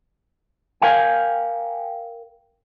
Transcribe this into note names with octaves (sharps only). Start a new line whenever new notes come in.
A#4 F5 G5 G#5